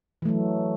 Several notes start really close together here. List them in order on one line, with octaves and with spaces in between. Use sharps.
E3 A3 F#3